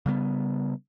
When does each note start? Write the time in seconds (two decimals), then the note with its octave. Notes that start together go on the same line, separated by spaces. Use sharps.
0.06 C#3 G3 A3 B3